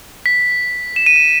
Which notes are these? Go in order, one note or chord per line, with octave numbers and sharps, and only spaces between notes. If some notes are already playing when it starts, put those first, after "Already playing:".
B6
E7
D#7
E7